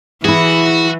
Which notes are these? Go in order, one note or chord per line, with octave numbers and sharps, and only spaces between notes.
E3 E4 F#4 G#4